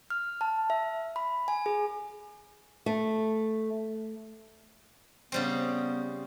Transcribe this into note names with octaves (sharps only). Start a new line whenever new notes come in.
F6
A5
E5
B5
G#5
G#4
A3
C#3 G3 B3 C4